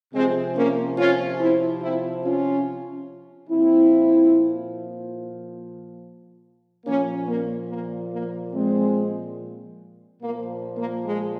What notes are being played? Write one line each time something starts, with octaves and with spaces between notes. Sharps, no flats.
C3 F3 G#3 C4
A#3 C#4
C#4 F4
C4 E4
C4 E4
C#4 F4
A#2 F3 C4 E4
A#2 F3 A#3 C#4
A#3
A#3
A#3
G#3 C4
A#2 F3 A#3
A#3
G#3